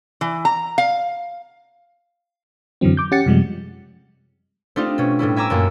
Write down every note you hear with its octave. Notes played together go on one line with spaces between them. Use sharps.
E3
A#5
F5
F#2 D3 E3 F#3 C4
D6 G6
C#4 G4 F#5 A6 C#7
F#2 C3 F3 G3 G#3
A3 C4 D4 D#4 F4 G4
B2 C#4
A2 G3 C#4 E4
E5 G#5 A#5 D6 E6
F#2 A#2 A#3